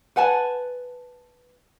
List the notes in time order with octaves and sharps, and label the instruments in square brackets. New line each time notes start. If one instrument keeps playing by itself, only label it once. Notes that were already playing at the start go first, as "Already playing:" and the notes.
[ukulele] B4 F#5 G#5 A5